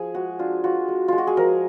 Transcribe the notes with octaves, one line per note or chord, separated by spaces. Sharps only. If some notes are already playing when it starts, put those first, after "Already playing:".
Already playing: F3 G#4
G#3 F#4
D4 F4
F4 F#4
G#3
G#3 F4
F#4
G#4
F3 A#4